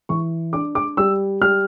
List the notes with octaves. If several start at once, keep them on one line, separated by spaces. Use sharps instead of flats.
E3 C#6
D4 D6
D6
G3 E6
G3 F6